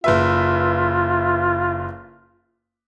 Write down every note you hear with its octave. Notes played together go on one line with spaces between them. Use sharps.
F#1 F4 B4 E5